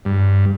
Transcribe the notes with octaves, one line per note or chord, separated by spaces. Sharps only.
G2